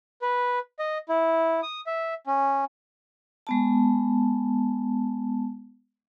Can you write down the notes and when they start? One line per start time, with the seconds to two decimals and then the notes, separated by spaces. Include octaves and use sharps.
0.22 B4
0.79 D#5
1.09 E4
1.63 D#6
1.87 E5
2.27 C#4
3.47 G#3 B3 A5